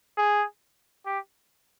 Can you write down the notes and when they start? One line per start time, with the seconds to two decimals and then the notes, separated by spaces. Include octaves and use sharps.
0.17 G#4
1.06 G4